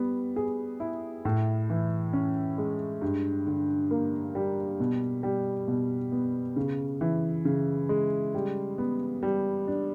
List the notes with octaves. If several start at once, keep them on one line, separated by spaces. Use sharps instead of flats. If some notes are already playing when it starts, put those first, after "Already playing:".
Already playing: G3 B3
G#4
E4
A2
E3
C#4
G#3
G2
D3
A#3
G3
B2
G3
B2
B3
C#3
E3
C#3
G#3
G3
B3
G3
D4